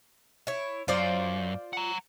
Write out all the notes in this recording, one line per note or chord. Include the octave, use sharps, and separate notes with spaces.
E4 C#5
F#2 F4 C5 D5
F#5 A#5